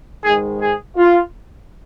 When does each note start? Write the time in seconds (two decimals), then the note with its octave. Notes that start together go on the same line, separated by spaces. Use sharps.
0.22 G#2 D#3 G#3 G#4
0.59 G#4
0.97 F4